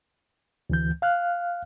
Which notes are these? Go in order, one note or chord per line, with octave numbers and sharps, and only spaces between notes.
D2 E3 G6
F5 F6 F#6